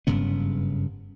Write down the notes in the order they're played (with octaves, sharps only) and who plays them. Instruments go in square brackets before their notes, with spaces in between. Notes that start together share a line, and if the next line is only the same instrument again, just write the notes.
[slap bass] F#1 G2 C#3 B3